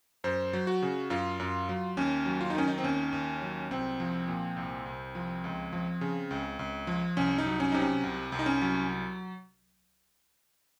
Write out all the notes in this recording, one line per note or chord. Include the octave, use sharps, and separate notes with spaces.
F#2 C5
F#3
F#4
C#3
F#2 F4
F#2
F#3
D#2 C#4
F#3
F4
D#4
D#3 C#4
D#4
C4
D#2 C#4
D#2
F#3
C2 C4
F3
A#2
C2
C2
F3
C#2
F3
C#3
C#2
C#2
F3
C2 C#4
D#4
F#3
C#4
C3 D#4
C#4
C2
C2
D#4
C#4
F#3